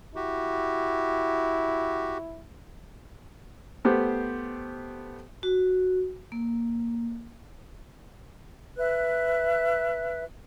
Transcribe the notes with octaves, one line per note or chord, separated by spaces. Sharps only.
E4 F#4 G4
A3 B3 G4 C5
F#4
A#3
B4 E5 F#6